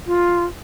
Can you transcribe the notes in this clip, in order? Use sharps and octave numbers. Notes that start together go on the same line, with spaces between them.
F4